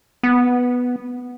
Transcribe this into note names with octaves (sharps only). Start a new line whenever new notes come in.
B3